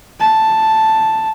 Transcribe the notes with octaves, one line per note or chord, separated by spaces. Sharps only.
A5